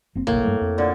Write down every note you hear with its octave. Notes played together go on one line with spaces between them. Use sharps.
F#1 A#3 C4
F#1 B1 A2 A#3
G2 G3 A3
F2
A#2 D3